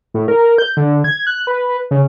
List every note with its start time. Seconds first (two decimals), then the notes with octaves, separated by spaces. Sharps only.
0.14 A2
0.28 A#4
0.58 G6
0.77 D3
1.04 G#6
1.27 F#6
1.47 B4
1.91 C#3